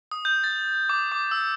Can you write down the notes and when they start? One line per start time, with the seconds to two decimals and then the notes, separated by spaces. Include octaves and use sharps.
0.11 D#6
0.25 G6
0.44 A6
0.89 D6
1.12 D6
1.31 E6